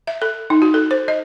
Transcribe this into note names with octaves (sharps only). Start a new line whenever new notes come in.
E5
A4
D#4
F#4
A4
C5
D#5